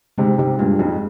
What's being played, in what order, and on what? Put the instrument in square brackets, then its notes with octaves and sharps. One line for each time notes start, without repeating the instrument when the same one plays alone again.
[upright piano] G#2 C3 [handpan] G#3
[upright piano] G#2 C3 [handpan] G4
[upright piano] G2 A#2 [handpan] G#3
[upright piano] F2 G#2 [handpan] G#3